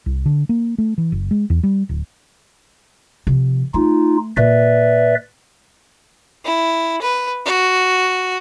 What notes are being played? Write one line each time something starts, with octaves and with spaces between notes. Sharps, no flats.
C2
D3
A#3
A3
E3
F#1
G#3
E2
G3
D1
C3 F3
A3 D#4 F4
A#2 B4 D5 E5
E4
B4
F#4